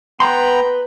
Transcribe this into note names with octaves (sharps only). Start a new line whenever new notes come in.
B3 B4 G5 A#5 C6